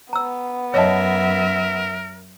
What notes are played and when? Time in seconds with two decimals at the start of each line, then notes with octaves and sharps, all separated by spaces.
0.13 B3 A#5 E6
0.74 F#2 A#4 C#5 D#5 E5 A5